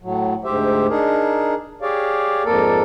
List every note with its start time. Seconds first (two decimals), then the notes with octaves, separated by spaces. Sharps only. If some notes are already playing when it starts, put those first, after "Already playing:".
0.03 A2 F#3
0.44 D2 G#2 G4 C5 E5
0.89 D4 D#4 G#4 A#4
1.82 G4 G#4 C#5 D5 F5
2.45 F2 G#2 A#3 A4 A#4 D5